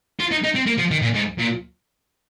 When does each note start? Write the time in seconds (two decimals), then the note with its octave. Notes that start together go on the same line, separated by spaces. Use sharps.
0.20 F4
0.32 D#4
0.44 D#4
0.56 C4
0.67 A#3
0.78 F3
0.91 D#3
1.02 A#2
1.14 G#2
1.38 A#2